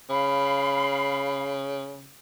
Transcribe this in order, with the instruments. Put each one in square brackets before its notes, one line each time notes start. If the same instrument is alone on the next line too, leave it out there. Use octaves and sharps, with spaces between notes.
[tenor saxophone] C#3 [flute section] F5 B5